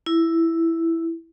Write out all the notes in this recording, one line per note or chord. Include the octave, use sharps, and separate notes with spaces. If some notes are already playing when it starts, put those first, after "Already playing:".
E4